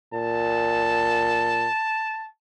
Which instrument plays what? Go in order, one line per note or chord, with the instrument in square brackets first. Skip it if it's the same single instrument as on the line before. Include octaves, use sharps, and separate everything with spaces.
[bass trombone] A#2 [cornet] A5